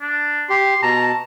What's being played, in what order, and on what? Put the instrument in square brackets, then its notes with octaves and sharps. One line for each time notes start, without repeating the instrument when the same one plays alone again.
[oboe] D4
[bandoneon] G4 [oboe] C6
[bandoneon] B2 A5 [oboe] A#5